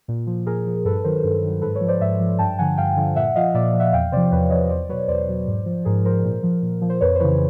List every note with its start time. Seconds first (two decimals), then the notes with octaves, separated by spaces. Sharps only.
0.08 A#2
0.27 F3
0.46 A#2 G#4 A#4
0.66 F3
0.85 G2 A4 B4
1.04 D#3 F#3 A#4 C5
1.24 G2
1.43 D#3 F#3
1.62 G#2 A4 B4
1.75 B4 C#5
1.81 F3
1.88 C5 D5
2.01 G#2 D5 E5
2.20 F3
2.39 G2 G5 A5
2.59 D3 F3 F#5 G#5
2.77 G2 F5 G5
2.97 D3 F3
3.16 A#2 E5 F#5
3.35 F3 D#5 F5
3.54 A#2 D5 E5
3.73 F3
3.80 E5 F#5
3.93 E2 F5 G5
4.12 C3 F3 C5 D5
4.31 E2 B4 C#5
4.50 C3 F3 C#5 D#5
4.70 E2 C5 D5
4.89 B2 F#3 B4 C#5
5.08 E2 C5 D5
5.27 B2 F#3
5.47 G#2
5.66 F3
5.85 G#2 G#4 A#4
6.05 F3 A#4 C5
6.24 A#2
6.43 F3
6.62 A#2
6.82 F3
6.90 C5
7.01 F2 B4 C#5
7.15 C5
7.20 C#3 E3 B4 C#5